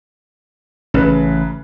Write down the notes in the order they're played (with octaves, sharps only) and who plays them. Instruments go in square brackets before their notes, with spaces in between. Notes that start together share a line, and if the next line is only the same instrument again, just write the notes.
[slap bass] A1 [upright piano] C#3 B4